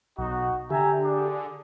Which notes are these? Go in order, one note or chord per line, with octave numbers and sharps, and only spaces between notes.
B1 D#4 F#4
D3 G4 E5 G#5 A#5
D4 G#4